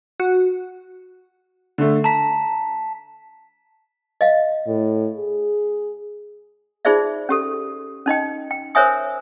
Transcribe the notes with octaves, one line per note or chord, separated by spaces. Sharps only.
F#4
D3 A3
A5 A#5 B6
D#5 F5
A2
G#4
D#4 F4 G#4 C5 D5 E5
C#4 G4 A4
C#4 D#4 D#5 G5
G5
A#4 C5 C#5 E5 G#5 D#6